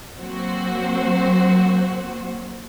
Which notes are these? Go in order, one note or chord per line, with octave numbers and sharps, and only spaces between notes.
F#3 A#3 C4 F#4 C5